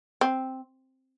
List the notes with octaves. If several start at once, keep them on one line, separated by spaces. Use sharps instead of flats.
C4